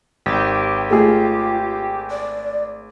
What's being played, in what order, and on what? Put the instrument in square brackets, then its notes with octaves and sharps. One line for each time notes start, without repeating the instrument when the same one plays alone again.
[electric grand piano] G#1 [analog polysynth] G4
[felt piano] A3 G#4 [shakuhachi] F4
[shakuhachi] D5